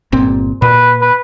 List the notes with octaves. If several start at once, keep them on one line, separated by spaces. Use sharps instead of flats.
G1 A#2 C4
A#2 B4
B4